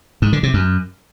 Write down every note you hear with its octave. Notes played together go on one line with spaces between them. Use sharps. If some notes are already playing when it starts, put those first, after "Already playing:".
G#2
D3
C3
F#2